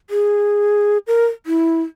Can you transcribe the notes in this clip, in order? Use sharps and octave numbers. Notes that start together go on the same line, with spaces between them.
G#4
A#4
E4